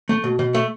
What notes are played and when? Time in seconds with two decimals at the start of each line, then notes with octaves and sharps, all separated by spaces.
0.09 A3
0.24 B2
0.39 B2
0.54 A3